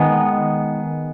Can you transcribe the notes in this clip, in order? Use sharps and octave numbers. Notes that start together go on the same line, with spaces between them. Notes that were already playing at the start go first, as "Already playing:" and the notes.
Already playing: D#3 G#3 B3